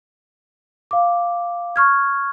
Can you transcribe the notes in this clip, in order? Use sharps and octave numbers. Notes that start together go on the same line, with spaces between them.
F5 D6
C#6 F6 G#6